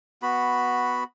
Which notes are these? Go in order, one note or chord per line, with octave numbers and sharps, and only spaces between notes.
B3 F#4 B5